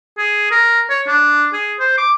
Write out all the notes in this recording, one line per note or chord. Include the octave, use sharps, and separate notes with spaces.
G#4
A#4
C#5
D4
G#4
C5
D6